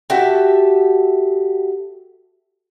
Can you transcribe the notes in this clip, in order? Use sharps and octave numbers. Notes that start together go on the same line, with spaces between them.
F#4 G4 A4 E5